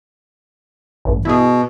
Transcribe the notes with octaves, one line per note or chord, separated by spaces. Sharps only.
A1 G2
B2 E4 G#4